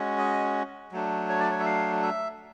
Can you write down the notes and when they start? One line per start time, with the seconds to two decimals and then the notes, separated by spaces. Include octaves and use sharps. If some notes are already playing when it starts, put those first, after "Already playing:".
Already playing: G#3 C#4 F#4
0.18 D#5
0.92 F#3 A3 D4
1.29 C#5
1.40 D5
1.51 C#5
1.60 E5
1.66 F5
2.02 E5